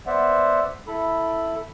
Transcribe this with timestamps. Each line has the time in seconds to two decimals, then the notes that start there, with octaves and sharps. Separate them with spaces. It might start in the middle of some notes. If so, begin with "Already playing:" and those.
0.07 B3 C5 D5 E5 F#5
0.87 E4 A4 B5